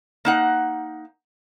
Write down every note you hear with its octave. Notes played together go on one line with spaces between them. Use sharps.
A#3 D#4 F#5